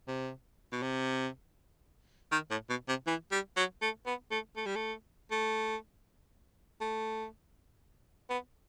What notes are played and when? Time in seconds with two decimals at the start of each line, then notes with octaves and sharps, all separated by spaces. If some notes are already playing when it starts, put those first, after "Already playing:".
0.07 C3
0.72 B2
0.82 C3
2.32 D#3
2.51 A2
2.69 B2
2.88 C3
3.07 E3
3.32 G3
3.56 F#3
3.82 A3
4.06 B3
4.31 A3
4.57 A3
4.66 G3
4.76 A3
5.31 A3
6.81 A3
8.30 B3